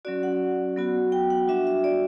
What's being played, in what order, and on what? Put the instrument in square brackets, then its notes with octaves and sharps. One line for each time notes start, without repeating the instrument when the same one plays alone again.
[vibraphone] F#3 C#4 F#4 D5
F#5
F#3 B3 F#4
G5
F#5
G3 D4 F#4 E5
E5
D5